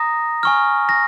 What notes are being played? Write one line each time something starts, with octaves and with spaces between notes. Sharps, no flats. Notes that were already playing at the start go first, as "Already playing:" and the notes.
Already playing: A#5 D#6 A#6
G#5 C#6 F6
A#6